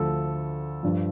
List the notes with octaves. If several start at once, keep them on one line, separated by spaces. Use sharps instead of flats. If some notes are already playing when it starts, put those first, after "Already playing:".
Already playing: D2 D3 F3 A4
G2 F3